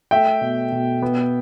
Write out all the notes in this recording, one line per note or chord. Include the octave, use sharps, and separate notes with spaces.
A3 E5 G5
B2
B2
B3